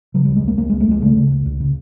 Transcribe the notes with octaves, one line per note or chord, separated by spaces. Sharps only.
C#3 F#3
C#2 G3
G#3
C#2 A#3
C#2 A#3
C#2 G#3
A3
C#2 G#3
C#3 A3
C#3
C#2
C#2
C#3